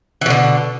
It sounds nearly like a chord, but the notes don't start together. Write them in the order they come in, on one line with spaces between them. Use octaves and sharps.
E3 B2 D3